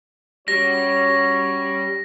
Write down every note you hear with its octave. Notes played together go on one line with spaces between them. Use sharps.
G3 C#4 F#4 C#5 A#6